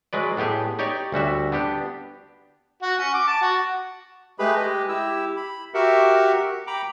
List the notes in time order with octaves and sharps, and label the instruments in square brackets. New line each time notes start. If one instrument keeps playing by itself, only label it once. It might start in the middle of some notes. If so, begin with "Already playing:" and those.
[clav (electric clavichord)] F#3 G#3 B4 D5
A2 B3 G4 G#4
D#4 G4 C#5 D5
D2 G3 F#4 E5
B3 D4 G4
[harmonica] F#4
C#4
D6
A5
F#4
[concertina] G#3 A3 G4 G#4 B4 B5
G#3 G4 D#5
E4 G4 E6
B5
F#4 G4 A#4 E5 F#5
G5 A#5 B5 D6